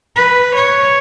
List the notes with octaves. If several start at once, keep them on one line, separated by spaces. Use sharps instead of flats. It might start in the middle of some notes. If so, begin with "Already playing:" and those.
B4
C#5